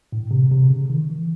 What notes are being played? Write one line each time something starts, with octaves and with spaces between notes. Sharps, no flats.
A2
C3
C3
C#3
D#3
E3